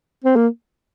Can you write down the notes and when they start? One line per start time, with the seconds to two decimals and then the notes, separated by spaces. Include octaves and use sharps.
0.24 C4
0.36 A#3